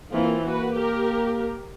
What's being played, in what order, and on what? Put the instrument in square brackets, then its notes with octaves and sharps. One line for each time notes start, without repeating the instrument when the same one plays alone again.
[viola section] E3 C4 F4 [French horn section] A#3
[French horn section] A#3 [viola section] F#4 B4
[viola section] G4 A#4